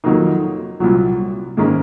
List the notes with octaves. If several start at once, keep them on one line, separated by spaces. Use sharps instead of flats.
F2 D#3 F#3 A#3 D#4
C2 A#2 F#3
G#2 D#3 A#3 C#4